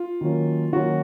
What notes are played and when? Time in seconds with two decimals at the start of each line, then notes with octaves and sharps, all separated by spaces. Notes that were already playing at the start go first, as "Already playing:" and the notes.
Already playing: F4
0.21 D#3 F#3 A#3 C#4
0.73 D#3 F#3 A#3 C#4 F#4